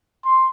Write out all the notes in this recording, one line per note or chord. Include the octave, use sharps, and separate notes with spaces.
C6